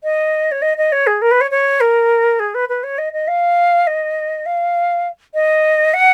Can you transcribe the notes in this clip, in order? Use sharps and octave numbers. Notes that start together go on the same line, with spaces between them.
D#5
C#5
D#5
D#5
C#5
G#4
A#4
B4
C#5
C#5
A#4
G#4
B4
B4
C#5
D#5
D#5
F5
D#5
F5
D#5
F#5